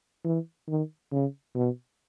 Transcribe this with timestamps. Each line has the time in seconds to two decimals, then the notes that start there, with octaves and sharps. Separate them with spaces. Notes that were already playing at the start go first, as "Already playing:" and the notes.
0.24 E3
0.68 D#3
1.12 C#3
1.55 B2